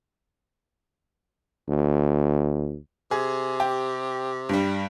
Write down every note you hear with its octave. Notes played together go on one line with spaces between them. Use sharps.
D2
C3 G#4
G4
G2 G3